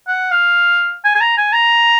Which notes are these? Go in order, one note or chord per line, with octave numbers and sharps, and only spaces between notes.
F#5
F5
G#5
G#5
A#5
G#5
A#5